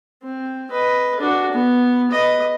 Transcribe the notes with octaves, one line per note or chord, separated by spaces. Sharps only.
C4
B4 D#5
D4 F#4
B3
B4 D#5